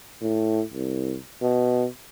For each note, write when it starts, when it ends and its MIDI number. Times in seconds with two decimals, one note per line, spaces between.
0.22 0.62 45
0.73 1.16 36
1.42 1.86 47